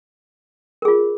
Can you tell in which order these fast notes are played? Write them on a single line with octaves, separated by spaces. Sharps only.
A#4 G#4 F4